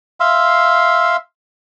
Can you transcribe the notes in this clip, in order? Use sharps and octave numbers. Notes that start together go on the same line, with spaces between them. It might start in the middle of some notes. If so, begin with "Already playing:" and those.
E5 F5 C6 E6